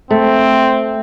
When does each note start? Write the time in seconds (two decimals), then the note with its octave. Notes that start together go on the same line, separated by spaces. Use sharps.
0.11 A3 C4